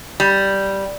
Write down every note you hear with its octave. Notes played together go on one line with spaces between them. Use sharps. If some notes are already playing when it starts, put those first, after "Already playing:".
G3